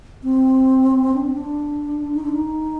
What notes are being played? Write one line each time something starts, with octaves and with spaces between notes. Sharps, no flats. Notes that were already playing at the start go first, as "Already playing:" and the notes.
C4
D4
C4
D4
D#4
D4
D#4